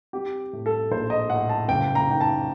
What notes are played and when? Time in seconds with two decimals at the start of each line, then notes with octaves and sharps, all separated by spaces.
0.13 C4 G4
0.53 A2
0.66 A4
0.91 A#1 C5
1.10 D#5
1.30 A2 F#5
1.49 A5
1.68 F#1 G5
1.95 A#5
2.07 D#3 G5
2.21 A5